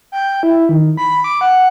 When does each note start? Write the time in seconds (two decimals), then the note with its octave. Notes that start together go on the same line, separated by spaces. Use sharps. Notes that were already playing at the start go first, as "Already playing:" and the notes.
0.12 G5
0.43 E4
0.69 D#3
0.97 B5
1.24 D6
1.41 F#5